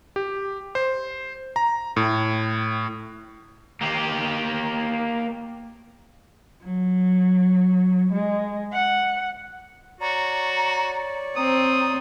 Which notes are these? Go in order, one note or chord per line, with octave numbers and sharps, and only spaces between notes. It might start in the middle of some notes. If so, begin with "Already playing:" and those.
G4
C5
A#5
A2
A#3 G4
F#3
G#3
F#5
F#4 C#5 D5 A#5
C4 A#5 D#6